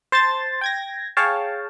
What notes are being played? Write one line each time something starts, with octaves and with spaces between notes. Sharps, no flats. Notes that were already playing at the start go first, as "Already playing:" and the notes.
C5 A5 C6 A6
G5 G#6 A#6
G#4 C#5 F5 G5 A5